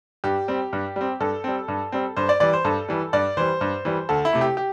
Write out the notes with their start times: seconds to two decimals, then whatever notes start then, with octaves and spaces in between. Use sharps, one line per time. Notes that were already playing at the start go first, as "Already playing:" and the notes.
0.24 G2 G4
0.48 G3 C4
0.73 G2
0.96 G3 C4
1.20 G2 A4
1.44 G3 C4
1.68 G2
1.92 G3 C4
2.16 G2 C5
2.29 D5
2.40 E3 G3 D5
2.53 C5
2.65 G2 A4
2.89 E3 G3
3.13 G2 D5
3.37 E3 G3 C5
3.61 G2
3.85 E3 G3
4.09 D2 A4
4.25 E4
4.33 C3 A3
4.41 G4
4.57 G4